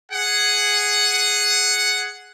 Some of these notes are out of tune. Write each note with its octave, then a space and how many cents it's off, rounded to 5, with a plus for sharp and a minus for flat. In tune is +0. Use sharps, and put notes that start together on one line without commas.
G#4 +0 F#5 +0